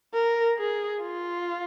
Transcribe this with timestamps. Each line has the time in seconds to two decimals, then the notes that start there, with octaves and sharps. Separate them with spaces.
0.14 A#4
0.58 G#4
1.02 F4